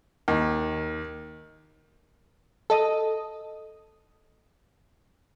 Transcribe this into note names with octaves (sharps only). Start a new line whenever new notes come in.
D#2
A4 D#5 D#6